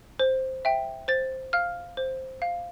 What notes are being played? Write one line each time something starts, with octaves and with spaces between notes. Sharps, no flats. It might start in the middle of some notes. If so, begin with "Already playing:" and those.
C5
E5 G5
C5 A6
F5 F6
C5
F5